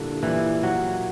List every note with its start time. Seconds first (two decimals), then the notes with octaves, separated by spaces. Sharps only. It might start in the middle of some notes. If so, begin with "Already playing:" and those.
Already playing: A#2 D3 G3 A#3 E4
0.23 A#2 E3 G3 A#3 E4
0.63 F#3